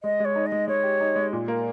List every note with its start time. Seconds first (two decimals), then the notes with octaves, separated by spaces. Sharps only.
0.03 G#3 D#5
0.20 G#3 C#5
0.36 D#4
0.46 D#5
0.52 G#3
0.68 G#3 C#5
0.84 G4
1.01 D#4
1.16 G#3
1.33 A#2
1.48 A#3